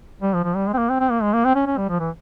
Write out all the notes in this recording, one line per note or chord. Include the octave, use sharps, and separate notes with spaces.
G3
F3
F3
G3
G#3
C4
A#3
C4
C4
A#3
G#3
A#3
C4
C#4
C#4
G3
F3
E3